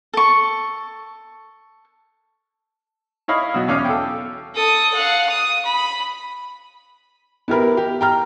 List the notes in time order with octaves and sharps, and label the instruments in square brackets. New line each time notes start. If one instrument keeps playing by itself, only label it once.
[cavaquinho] A4 C#6
[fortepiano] E4 C#5 D#5 F5 B5
B2 F#3
E2 C#4 F5 D6
A4 G5
[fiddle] A4 D#6
F5 F#5
D#6
B5
[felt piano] B3 E4 G4 A#4 B5
G4
G5 A#5 F6